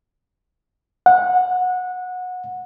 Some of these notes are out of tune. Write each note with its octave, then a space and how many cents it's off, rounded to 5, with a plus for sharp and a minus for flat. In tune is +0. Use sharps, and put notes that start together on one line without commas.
F#5 -20